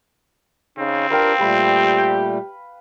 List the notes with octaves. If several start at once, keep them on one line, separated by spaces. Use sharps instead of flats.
C#3 C4 D#4
D4 F4 G4 A#4 B4 F5 G5
A#2 G3 A3 G4 B4